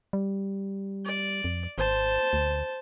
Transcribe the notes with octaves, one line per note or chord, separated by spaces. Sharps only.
G3
D5
F2
G#1 C5 A5
D2